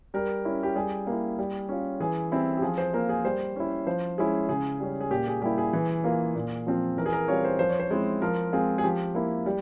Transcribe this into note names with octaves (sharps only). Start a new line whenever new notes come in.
G3 A#4
C#4 E4
G4
G3 G#4
A#3
E4
G3
C#4 F4
E3 G#4
G3 C4 E4
G4
F3 G#4
C5
A#3 F4 A#4
G#4
G3 C5
C#4 E4
F3 C5
G#3 C#4 E4 G#4
C#3 G#4
G3 C#4
G#4
A#2 G4
G#4
G3 A#3 E4 G4
G#4
E3
A#3 F4
A#2
F3 C4 F4
E3 A#4
G#4
A#4
G3 C4 F4 C#5
C5
F3 C5
C#5
C5
G#3 C4 E4
F3 A#4
G#3 C4 F4 G#4
G#4
F3 G4
A#3 E4
G3